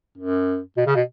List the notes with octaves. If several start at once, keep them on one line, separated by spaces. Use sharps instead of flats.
F#2
B2
C#3
B2